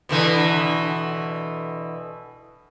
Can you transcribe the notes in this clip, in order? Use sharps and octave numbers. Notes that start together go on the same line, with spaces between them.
B2 D3 E3